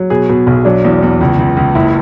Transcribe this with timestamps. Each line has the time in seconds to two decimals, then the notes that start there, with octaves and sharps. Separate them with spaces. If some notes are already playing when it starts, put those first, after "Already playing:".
Already playing: F#3
0.10 B2 G#4
0.29 B2
0.47 B1
0.65 F#3 D4
0.84 E2
1.03 E2
1.21 C#2
1.39 C#2
1.57 C#2
1.75 F#1 E4